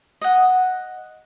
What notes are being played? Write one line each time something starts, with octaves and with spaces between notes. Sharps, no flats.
D#5 F#5